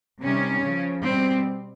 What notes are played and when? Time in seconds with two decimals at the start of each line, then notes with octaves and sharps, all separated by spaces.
0.22 C3 D#3 G3 C#4
0.65 C#3 F3
1.05 B2 G3 C4